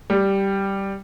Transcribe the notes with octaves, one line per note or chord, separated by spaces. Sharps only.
G3